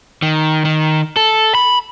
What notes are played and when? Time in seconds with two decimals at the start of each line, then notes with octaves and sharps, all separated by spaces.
0.22 D#3
0.65 D#3
1.16 A4
1.55 B5